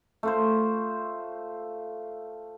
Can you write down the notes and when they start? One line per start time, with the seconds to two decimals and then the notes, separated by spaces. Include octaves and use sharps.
0.23 A3 F4 C5